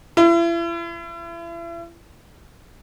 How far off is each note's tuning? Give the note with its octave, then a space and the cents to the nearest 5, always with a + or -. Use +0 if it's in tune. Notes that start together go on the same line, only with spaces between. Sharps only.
E4 +40